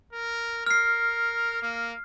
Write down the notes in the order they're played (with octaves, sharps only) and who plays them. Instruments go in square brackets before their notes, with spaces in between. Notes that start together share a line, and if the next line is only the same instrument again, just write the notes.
[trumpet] A#4
[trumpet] A#4 [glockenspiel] F6 C7
[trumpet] A#3